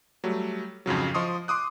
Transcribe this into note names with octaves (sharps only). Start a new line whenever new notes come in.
F#3 G3 A3
F2 G#2 C#3 F#3
F3 D#5 C6 C#6 D#6
C6 D6 D#6 F#6